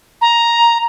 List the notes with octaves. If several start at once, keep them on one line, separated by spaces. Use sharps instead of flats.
A#5